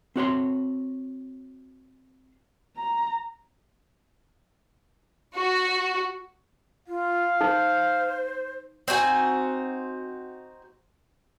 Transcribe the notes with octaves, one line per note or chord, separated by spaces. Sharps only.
C4 F#4 C#5 C6
A#5
F#4
F4 F5
D#4 C5
C4 D#4 F#4 G#5